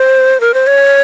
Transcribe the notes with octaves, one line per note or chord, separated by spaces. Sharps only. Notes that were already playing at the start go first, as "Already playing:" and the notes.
Already playing: C5
A#4
C5
C#5